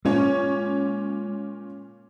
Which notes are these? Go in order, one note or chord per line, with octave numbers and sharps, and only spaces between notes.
A#2 G#3 C#4 C#5